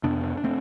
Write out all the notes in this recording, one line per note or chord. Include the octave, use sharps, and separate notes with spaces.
F2 C3 B3 D4
D4
A3 C4